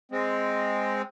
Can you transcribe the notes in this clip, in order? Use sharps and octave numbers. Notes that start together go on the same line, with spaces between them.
G#3 C4